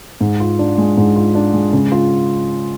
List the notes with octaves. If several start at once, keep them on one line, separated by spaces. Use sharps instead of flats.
G#2
F4
D4
G#3
G#2
F4
D4
G#3
C#3
F4